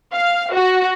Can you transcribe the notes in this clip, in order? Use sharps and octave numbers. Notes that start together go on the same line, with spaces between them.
F5
F#4